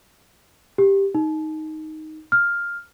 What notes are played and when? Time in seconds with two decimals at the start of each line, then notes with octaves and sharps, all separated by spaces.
0.78 G4
1.15 D#4
2.32 F6